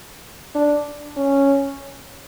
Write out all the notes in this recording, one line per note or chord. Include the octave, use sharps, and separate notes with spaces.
D4
C#4